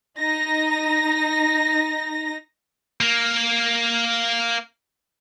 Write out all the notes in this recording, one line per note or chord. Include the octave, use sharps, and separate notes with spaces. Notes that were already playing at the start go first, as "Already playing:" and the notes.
D#4 A#6
A#3 A#4